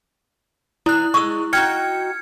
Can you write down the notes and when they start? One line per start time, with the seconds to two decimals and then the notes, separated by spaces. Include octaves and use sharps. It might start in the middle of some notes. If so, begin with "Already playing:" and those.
0.86 E3 E4 F#6
1.14 G#3 C#6 D#6 E6
1.53 D#4 F#4 G5 F6 G#6 C#7